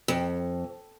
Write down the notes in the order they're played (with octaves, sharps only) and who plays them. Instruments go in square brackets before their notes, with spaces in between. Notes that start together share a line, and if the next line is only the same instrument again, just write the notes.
[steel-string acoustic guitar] F2